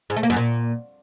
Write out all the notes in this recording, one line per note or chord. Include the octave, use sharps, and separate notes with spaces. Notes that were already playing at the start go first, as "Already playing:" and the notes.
G#2
A3
A#3
F#2
A#2